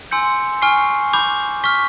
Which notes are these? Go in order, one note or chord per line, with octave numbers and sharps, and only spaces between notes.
G#5 C6 E6 G6 C#7
G#5 C#6 F6 C7
B5 D6 G6
C#6 F6 B6